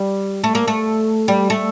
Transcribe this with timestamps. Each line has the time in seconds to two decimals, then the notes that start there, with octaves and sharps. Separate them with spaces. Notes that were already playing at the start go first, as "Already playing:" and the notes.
Already playing: G3
0.44 A3
0.55 A#3
0.67 A3
1.28 G3
1.50 A3